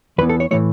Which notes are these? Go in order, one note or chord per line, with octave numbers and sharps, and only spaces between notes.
E2 E3 B3 B4
A4
C#5
A2 E3 A3 C#5